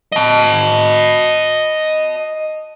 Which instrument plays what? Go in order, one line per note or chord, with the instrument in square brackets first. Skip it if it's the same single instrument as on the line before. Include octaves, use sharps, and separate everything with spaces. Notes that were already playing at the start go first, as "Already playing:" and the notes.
[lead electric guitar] D#5 A5